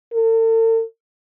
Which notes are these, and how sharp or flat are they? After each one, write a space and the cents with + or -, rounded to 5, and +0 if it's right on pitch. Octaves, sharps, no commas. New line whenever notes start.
A4 +45